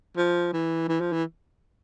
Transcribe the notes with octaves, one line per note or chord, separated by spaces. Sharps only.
F3
E3
E3
F3
E3